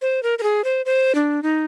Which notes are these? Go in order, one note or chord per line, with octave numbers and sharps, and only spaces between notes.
C5
A#4
A#4
G#4
C5
C5
D4
D#4